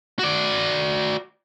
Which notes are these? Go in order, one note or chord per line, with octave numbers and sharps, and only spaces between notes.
F#4 D5